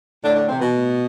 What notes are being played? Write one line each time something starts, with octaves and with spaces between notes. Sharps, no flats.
A2 D3 D4
D3 D4
C3 E3 C4
B2 B3
A2